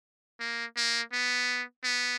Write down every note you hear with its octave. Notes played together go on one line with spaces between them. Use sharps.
A#3
A#3
B3
B3